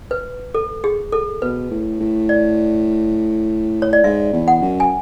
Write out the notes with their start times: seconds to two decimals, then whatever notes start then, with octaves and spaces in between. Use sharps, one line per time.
0.11 B4
0.54 A4
0.84 G#4
1.12 A4
1.42 B2 B4
1.71 A2
2.00 A2
2.29 D5
3.82 C#5
3.93 D5
4.04 G#2 E5
4.33 E2
4.48 F#5
4.62 F#2
4.80 G#5